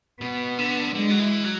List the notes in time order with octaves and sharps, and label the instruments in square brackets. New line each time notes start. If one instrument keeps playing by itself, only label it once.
[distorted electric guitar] B2 [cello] B3
[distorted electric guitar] D3
[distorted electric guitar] D3 [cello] G#3
[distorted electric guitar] F#3
E3
F#3